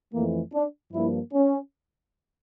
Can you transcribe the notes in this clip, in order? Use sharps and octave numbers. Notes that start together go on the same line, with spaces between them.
F2 E3 A3 A#3
D4
G2 F3 A#3 E4
C#4